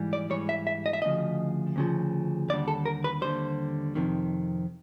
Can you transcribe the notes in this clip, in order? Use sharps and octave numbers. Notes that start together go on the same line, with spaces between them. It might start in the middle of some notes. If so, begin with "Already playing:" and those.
Already playing: G#2 E3 G3
D5
G#2 E3 G3 C#5
E5
E5
D#5
E5
D2 C#3 F3 D#5
D2 C#3 F3
D#2 D3 G3 D5
A4
A#4
B4
D#2 D3 G3 C5
F2 C3 D#3